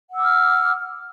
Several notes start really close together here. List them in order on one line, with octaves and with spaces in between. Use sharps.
F#5 E6 D6 F6